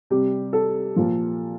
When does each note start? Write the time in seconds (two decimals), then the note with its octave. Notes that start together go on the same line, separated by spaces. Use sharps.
0.10 C3 G3 G4
0.53 A4
0.96 A#2 F3